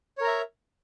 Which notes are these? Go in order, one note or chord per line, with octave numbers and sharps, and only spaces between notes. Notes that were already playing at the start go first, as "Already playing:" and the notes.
A#4 C#5 E5 A#5